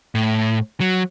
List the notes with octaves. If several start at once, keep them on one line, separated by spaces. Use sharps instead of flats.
A2
F#3